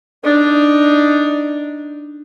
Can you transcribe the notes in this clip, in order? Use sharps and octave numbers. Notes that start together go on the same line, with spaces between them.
D4 D#4